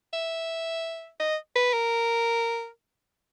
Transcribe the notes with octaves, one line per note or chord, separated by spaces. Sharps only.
E5
D#5
B4
A#4